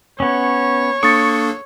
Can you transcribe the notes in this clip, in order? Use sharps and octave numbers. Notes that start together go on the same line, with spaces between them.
B3 C#4 C#5
A#3 D4 A4 C#6 D#6 A6 C#7